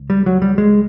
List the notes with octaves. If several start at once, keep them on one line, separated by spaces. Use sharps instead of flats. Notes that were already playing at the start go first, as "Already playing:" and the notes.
Already playing: C#2
G3
F#3
G3
G#3